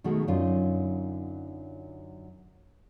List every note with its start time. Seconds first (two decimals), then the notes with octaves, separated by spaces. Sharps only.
0.04 B2 D#3 G#3 A3 F#4
0.28 F#2 D3 F#3 D#4 F4